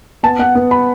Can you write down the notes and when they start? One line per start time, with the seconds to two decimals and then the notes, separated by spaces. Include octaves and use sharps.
0.23 B3 A5
0.39 B3 F#5
0.55 B3
0.71 B5